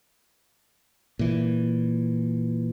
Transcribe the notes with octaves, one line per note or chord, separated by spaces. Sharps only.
A#2 E3